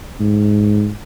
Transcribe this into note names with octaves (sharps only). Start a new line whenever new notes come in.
G#2